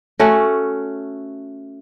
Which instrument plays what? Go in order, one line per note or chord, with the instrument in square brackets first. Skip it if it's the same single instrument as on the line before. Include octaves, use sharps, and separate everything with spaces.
[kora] A3 C#4 F#4